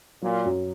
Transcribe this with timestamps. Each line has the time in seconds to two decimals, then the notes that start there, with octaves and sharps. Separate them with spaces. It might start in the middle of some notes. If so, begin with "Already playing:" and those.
0.22 A#2 F#3
0.45 F#2